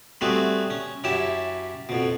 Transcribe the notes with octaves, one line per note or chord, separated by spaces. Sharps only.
G3 A3 B3 C4 F#4 G#4
C#4
F#2 C#4 E4 G4 A5
F2 B2